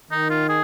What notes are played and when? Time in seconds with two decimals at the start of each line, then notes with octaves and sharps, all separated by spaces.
0.11 D#3 D#4
0.30 F4
0.49 G#4